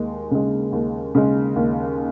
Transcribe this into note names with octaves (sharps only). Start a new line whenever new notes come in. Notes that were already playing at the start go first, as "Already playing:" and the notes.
Already playing: D#2 G#3
C#3 G#3
D#2
C#3 G#3
D#2